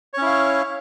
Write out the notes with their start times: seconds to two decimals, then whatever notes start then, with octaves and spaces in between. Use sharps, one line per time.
0.14 C#5
0.18 C#4
0.22 E4
0.26 F5